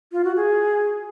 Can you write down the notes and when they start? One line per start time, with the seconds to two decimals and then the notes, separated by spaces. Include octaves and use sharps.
0.12 F4
0.24 F#4
0.36 G#4